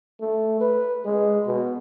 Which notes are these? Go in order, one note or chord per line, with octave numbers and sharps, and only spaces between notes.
A3
B4
G#3
B2